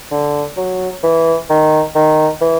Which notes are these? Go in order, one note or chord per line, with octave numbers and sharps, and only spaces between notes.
D3
F#3
E3
D#3
D#3
E3